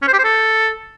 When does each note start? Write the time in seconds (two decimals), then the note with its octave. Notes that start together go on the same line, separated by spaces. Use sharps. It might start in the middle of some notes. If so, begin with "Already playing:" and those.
0.02 C#4
0.08 C5
0.13 G4
0.19 C5
0.24 A4